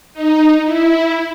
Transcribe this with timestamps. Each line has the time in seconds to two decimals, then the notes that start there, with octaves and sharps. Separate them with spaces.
0.13 D#4
0.65 E4